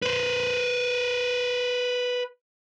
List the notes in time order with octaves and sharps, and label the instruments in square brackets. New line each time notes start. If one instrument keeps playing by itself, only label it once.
[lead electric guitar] B4 C5